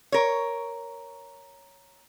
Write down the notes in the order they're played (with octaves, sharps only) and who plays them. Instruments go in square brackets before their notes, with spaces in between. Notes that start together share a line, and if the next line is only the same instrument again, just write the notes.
[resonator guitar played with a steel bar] A#4 C#5